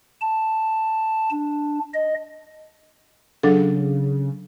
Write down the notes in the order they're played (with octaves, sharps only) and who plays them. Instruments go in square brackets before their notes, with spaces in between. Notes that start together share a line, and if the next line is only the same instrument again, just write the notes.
[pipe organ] A5
D4
D#5
[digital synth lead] C#3 [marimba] F#3 D4 A4